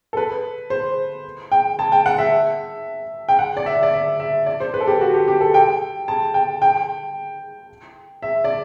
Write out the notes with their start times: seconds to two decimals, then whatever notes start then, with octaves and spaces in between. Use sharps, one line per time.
0.13 A4
0.17 B4
0.70 C5
1.52 G5
1.79 A5
1.92 G5
2.06 F#5
2.18 E5
3.29 G5
3.39 F#5
3.57 D5
3.66 E5
3.83 D5
3.94 E5
4.20 E5
4.46 D5
4.60 C5
4.74 B4
4.80 A4
4.87 G4
5.01 F#4
5.14 G4
5.28 G4
5.41 A4
5.54 G5
6.08 A5
6.34 G5
6.62 G5
8.22 E5
8.44 D5